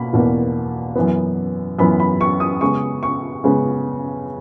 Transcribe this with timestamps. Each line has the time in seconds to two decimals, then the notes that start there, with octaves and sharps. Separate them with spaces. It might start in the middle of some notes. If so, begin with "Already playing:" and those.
Already playing: B2 A#3 B5
0.13 E2 B2 A#3
0.96 F#2 E3 B3
1.79 F#2 E3 B3 B5
2.00 B5
2.21 C#6
2.40 D#6
2.61 C#3 G#3 B3 C#6
3.03 C#6
3.44 C#3 G#3 B3